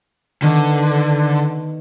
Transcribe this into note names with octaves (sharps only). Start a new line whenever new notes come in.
D3 D#3 B3